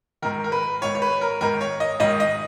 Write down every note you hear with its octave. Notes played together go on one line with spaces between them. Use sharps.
G#2 D#3 A#4
A#4
B4
G#2 D#3 C#5
C#5
B4
A#4
G#2 D#3 A#4
C#5
D#5
G#2 D#3 D#5
D#5